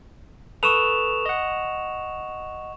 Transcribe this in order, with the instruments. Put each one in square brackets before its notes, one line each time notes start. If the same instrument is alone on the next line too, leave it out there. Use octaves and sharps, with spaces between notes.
[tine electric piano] A4 B4 D#6 [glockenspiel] C#6 E7 F7
[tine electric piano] D#5 F#5